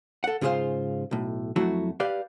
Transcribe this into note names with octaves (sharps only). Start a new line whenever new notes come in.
A4 F#5
G#2 C#3 F4 G#4 C5 F5
B1 A2
F2 F#3 A3 E4 F#4
G4 B4 D5 F5